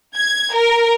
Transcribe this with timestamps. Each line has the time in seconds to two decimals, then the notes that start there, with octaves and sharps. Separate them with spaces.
0.17 G#6
0.54 A#4